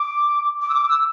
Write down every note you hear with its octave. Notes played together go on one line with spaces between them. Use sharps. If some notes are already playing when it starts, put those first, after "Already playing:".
Already playing: D6
D6
E6
D6
E6